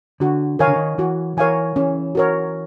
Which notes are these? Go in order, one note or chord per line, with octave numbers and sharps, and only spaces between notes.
D3 F#4
D#3 A#4 C#5 F5 G#5
D3
D#3
E3 F#4
E3 A#4 C#5 F5 G#5
E3 C#4
F#4 A#4 C#5